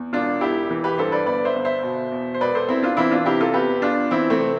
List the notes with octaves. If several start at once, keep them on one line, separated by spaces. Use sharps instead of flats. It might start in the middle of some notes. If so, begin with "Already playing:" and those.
Already playing: E2
E1 D4 F4
E1 E4 G4
E3
G4 B4
G2 A4 C5
B4 D5
G1 B4 D5
C5 E5
G1
C5 E5
B2
E2
C5
E1 B4 D5
A4 C5
E1 C4 E4
D4 F4
E3 C4 E4
D4 F4
C3 E4 G4
F4 A4
E2 G4 B4
E2 D4 F4
E3 C4 E4
A3 C4
C3